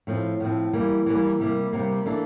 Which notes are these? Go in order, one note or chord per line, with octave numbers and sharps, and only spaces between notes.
A2 F3 C4
A2 F3 C4
E3 G3 A#3
E3 G3 A#3
C3 G3 A#3
C3 G3 A#3
E3 A#3 D4 A4